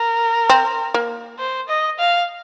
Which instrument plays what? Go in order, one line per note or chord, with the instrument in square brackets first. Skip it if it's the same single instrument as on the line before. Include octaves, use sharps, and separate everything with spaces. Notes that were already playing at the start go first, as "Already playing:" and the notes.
Already playing: [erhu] A#4
[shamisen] C4
A#3
[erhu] C5
D#5
F5